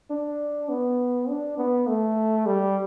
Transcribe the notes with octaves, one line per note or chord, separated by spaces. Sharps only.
D4
B3
D4
B3
A3
G3